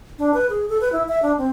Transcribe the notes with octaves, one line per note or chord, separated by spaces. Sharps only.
D4
B4
G#4
A4
B4
E4
E5
D4
C4